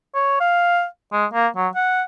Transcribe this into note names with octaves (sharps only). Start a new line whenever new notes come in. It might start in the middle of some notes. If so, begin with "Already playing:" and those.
C#5
F5
G#3
A#3
F#3
F#5